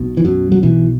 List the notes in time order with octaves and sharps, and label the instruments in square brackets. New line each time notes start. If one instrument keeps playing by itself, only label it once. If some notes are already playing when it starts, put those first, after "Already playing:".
Already playing: [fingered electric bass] B1 B2
E3
F#2 F#3
F#3
B1 B2 E3